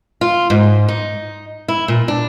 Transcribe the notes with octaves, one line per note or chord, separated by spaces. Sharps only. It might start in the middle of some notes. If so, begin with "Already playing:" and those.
F4
G#2
D#4
E4
A#2
D4